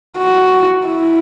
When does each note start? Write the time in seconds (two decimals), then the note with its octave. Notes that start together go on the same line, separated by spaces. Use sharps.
0.18 F#4
0.86 E4